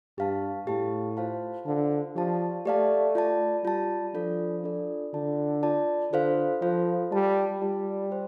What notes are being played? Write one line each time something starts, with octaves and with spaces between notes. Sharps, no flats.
G2 G4 F5 A5
A2 G4 F5 A5
F4 C5 F5 A5
D3 F4 C5 F5 A5
F3 G4 D5 F5 A5
A3 G4 D5 F5 A5
F4 D5 A5
G3 F4 D5 A5
F3 D4 F4 A4 D5
D4 F4 A4 D5
D3 F4 D5 A5
F4 D5 A5
D3 F4 A4 C5 F5
F3 F4 A4 C5 F5
G3 F4 D5 A5
G3 F4 D5 A5
G4 C5